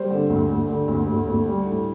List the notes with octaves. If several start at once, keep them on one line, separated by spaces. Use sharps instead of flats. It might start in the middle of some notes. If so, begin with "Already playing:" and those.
Already playing: G3 C5
D3
D2
D2
D3
D2
D2
D2
G3
A2